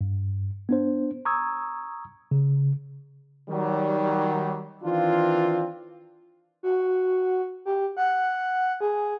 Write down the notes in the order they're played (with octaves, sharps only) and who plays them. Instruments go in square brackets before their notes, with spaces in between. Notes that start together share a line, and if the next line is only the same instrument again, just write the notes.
[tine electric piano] G2
B3 D4 C5
A#5 C#6 D#6 E6 G#6
C#3
[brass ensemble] D#3 F#3 G3
D#3 E3 C4 D4 F4
[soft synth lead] F#4
G4
F#5
G#4